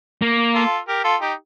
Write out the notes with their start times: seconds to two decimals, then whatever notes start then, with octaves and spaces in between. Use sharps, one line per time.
0.22 A#3
0.55 F4 A4
0.88 G4 A#4
1.04 F4 A4
1.21 D#4 G4